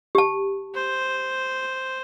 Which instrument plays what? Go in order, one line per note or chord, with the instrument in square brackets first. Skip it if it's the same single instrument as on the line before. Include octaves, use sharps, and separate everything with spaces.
[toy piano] G4 A5
[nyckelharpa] C5